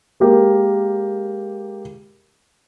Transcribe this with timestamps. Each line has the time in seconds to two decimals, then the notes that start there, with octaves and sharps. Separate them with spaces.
0.20 G#3 A#3 G4 A#4